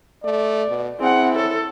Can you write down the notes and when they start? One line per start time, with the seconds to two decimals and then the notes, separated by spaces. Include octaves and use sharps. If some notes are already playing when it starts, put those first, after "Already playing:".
0.24 A3 D5
0.69 B2
1.00 C4 E4 G#4 F#5
1.36 A4 C#5